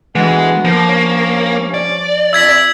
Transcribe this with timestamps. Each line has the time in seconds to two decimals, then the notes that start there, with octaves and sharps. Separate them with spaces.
0.15 D2 E3 G#3 B3 F#5
0.65 F3 A#3
0.88 G2 C#4 C#5
1.74 D5
2.33 F2 E5 E6 G#6 B6